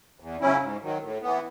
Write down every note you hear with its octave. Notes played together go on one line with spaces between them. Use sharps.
E2
C#3 F#3 C#4 E4
G#2
D#3 F#3
A2
E3 B3